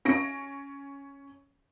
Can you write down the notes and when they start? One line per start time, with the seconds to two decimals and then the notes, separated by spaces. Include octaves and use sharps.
0.05 C#4 A#6 D7